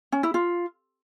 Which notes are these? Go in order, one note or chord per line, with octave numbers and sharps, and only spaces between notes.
C#4
E4
F4